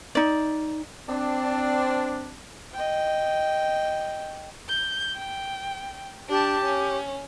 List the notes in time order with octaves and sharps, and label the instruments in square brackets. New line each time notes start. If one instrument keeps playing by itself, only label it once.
[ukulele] D#4 D5
[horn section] C4 D4
[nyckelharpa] D#5 G5
[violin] G6
G5
[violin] D4 A5 [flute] G4
[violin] C#4